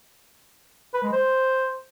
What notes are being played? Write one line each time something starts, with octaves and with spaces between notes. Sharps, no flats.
B4
G#3
C5